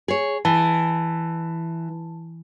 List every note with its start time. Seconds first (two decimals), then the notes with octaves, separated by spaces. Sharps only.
0.08 G#4 C#5
0.45 E3 A5